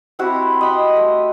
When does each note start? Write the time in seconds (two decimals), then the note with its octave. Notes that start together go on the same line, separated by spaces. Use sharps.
0.19 C4 E4 F#4 G4
0.61 D#5 B5 C6
0.96 A3